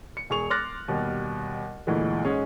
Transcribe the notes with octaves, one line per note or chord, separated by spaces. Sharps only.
C#7
E1 G#4 C#6 F7
C6 D6 F6 F#6 A6 A#6
D#2 B2 G3
D2 A#2 E3 G#3
G#2 G#3 C#4 G#4